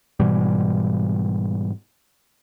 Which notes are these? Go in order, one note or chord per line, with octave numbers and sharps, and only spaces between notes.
G#2 B2 E3 G3